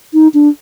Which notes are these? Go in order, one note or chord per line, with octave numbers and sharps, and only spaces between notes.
D#4
D4